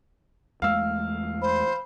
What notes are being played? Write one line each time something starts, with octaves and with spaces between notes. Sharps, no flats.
E2 G#3 A3 F5 E6 F6
C5 B5